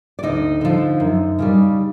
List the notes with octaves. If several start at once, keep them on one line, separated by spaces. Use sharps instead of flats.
D5
D2 D#4 D#5
D3 F3
F#2
C#3 E3 G3